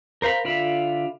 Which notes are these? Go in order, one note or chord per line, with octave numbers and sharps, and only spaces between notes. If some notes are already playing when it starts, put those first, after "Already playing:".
A#4 C5 F5 B5
D3 F4 E5 F5 B5